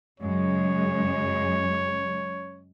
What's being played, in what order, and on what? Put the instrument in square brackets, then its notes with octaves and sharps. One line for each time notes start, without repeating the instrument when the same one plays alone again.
[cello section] F#2 C#3 G#3 [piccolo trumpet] C#5